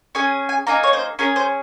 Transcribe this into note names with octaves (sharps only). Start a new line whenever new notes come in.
C#4 G#4 G#5
G#5
A#3 D#4 G#4 A#5
C#5
C5
C#4 G#4 A#4
C5